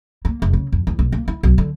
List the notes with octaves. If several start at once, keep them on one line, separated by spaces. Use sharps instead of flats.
A#3
F1
C#3
F2
E2
B1
A#3
E4
B1
D3